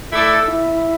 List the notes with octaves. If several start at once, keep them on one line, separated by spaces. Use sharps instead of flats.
A3 E4 A4 D5
E4